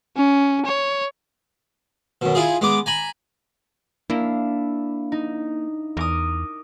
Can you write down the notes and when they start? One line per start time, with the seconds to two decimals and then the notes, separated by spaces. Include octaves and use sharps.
0.17 C#4
0.65 C#5
2.21 F#2 B2
2.35 E4 F4 G#4
2.61 G#3 B3 D6
2.86 G#5 A#5 B5
4.10 A#3 D4 E4 F5
5.12 D#4
5.97 E2 A#4 D6 D#6